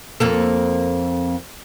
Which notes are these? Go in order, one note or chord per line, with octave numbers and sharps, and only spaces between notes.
F2 A#3 A4